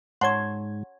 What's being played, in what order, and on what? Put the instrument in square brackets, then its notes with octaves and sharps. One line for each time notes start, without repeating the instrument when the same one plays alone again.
[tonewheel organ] G#2 [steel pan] C#5 A5 C6 [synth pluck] F#5 G#6